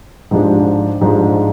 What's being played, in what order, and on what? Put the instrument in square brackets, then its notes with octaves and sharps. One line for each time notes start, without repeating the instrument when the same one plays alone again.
[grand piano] G#2 F3 G#3 D4 G4
G#2 F3 G#3 D4 G4